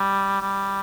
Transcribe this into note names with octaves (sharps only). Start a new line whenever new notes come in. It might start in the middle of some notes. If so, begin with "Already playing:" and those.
Already playing: G3
G3